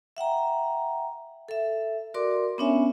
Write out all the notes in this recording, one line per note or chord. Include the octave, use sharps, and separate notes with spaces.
E5 F#5 G5 A#5
A4 E5
F#4 A#4 D5 C6 D6
B3 C#4 D4 C#5 E5 G#5